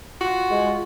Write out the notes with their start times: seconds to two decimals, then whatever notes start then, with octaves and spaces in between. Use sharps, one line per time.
0.21 F4 F#4
0.51 G#3